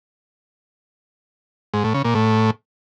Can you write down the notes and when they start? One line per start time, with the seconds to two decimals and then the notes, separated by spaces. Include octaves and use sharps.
1.74 G#2
1.84 A2
1.94 C#3
2.04 A#2
2.15 A2